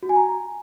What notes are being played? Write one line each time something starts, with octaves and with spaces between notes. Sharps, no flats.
F#4
G#5
A#5